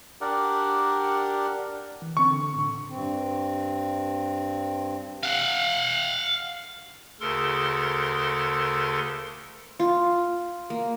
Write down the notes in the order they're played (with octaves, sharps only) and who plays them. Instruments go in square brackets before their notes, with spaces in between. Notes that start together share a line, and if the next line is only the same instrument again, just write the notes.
[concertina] D4 G4 A#4 D5 F#5
[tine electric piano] E3
[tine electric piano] D3 C4 [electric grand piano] C#6
[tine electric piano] D3
A2 D3
[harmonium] G2 C4
[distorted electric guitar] F5 F#5
[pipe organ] D2 C#3 A4 A#4 C6
[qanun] F4
A#3